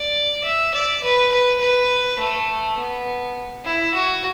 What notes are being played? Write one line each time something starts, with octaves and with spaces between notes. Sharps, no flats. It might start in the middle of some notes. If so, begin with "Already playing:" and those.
Already playing: D5
E5
D5
B4
B4
B4
A3
B3
E4
F#4